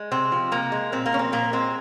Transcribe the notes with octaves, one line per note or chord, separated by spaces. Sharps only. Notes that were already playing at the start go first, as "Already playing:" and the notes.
Already playing: G#3
C3 C4
F3
C3 A#3
G#3
A#2 C4
A#3
F3 C#4
C4
A#2 A#3
G#3 C4